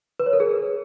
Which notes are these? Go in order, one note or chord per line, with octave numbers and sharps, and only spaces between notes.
B4
C#5
A#4
G#4